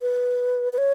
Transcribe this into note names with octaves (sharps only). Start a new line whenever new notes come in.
B4
B4
C#5